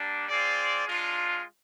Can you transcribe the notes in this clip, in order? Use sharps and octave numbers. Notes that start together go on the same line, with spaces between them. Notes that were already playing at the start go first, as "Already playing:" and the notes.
Already playing: G3 A#3 D4
C4 F4 G#4 D5
G#3 D4 F4